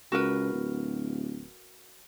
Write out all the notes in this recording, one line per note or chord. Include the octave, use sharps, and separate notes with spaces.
C#2 F#4 A#4 B4
D1